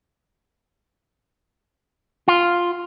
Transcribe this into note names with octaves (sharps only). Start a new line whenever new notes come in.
F4